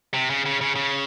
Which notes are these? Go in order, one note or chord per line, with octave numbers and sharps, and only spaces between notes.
C3
C#3
C#3
C#3
C#3